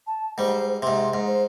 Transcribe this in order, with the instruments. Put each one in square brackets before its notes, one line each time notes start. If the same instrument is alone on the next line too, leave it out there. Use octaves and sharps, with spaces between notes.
[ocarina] A5
[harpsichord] G#2 G3 [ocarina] C5
[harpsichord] G#2 C3 [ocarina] C6
[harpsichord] G#2
[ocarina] C5